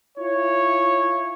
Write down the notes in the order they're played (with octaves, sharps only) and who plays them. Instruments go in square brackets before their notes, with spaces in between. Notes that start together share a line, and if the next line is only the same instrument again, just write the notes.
[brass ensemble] E4 F4 C#5